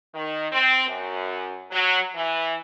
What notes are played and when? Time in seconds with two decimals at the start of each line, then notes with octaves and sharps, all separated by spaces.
0.14 D#3
0.52 C4
0.88 F#2
1.71 F#3
2.15 E3